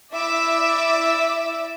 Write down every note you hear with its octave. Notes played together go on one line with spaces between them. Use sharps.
E4 D5 E5 D6 E6